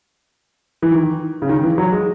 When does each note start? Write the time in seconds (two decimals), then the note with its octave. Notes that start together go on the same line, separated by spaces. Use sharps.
0.82 E3
0.92 D#3
1.42 C#3
1.49 D#3
1.63 E3
1.78 F#3
1.92 G#3